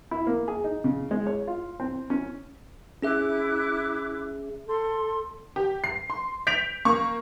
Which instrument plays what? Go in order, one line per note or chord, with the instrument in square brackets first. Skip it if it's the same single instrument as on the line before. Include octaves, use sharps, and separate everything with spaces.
[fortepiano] E4
A#3
G#4
D#4
C#3
G#3
C#5
F4
C4
C#4
[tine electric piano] C#4 G#4 E5 [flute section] E4 D6 F#6
[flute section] A4 C6
[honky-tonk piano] G4
C7
C6
G6 B6 D7 F7
A#3 C#6